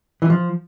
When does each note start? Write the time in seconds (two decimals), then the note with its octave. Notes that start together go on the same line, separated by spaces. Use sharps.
0.22 E3
0.30 F3